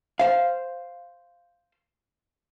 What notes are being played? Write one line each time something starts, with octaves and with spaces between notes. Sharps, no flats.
C5 F5